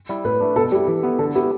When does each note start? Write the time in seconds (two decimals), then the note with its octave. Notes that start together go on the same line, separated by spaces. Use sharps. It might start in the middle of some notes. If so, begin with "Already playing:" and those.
0.09 G3 E4
0.25 A2 B4
0.41 A3 D4
0.56 B2 A4
0.72 G3 E4 G4
0.88 E3
1.03 B3 E4
1.19 D3 A4
1.35 B3 E4 G4